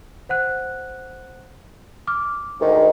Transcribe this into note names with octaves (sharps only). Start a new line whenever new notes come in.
C5 F#5 F#6
D6 F6
D2 G#2 D#3